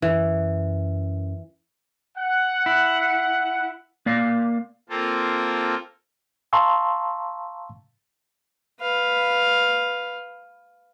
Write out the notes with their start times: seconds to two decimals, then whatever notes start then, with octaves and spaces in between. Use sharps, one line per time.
0.02 F#2 E3
2.17 F#5
2.66 E4
4.06 A#3 D5 F5
4.89 A#3 C4 F4 A4 A#4
6.53 F5 A5 A#5 C6 C#6 E6
8.81 B4 F5